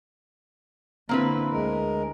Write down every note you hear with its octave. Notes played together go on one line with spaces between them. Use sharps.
D3 A#3 C4 E4 B4
D2 G#3 A#4